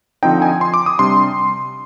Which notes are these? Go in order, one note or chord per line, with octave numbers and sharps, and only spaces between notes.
D3 F3 C4 D#4 G5
G#5
C6
D6
D#6
C3 G3 D4 C6